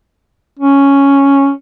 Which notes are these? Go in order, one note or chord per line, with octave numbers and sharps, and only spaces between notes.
C#4